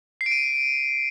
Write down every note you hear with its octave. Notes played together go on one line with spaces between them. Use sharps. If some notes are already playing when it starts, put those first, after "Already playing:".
C7
D7
D#7